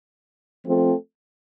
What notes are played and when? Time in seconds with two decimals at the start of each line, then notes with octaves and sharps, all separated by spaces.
0.66 F3 A3 C4 F4 A4